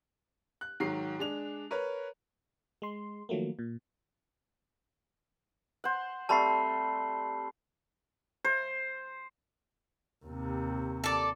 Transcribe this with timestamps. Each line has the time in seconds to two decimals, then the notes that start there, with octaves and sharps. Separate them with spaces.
0.61 F#6
0.80 G#2 D#3 F#3 C7
1.19 G#3 D4 F7
1.71 A#4 B4 C#5
2.82 G#3 C6
3.29 D#3 F3 F#3 A3 A#3
3.59 A#2
5.84 C5 F#5
6.29 G3 A3 C4 A5 B5 C7
8.45 C5
10.25 D#2 C3
11.04 A4 D5